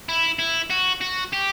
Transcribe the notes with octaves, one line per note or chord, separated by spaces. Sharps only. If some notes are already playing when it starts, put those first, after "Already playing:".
E4
E4
F#4
F#4
G4